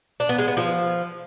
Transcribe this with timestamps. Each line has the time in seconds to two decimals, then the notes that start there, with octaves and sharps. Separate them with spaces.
0.20 D4
0.29 B3
0.38 G#3
0.48 B3
0.57 F3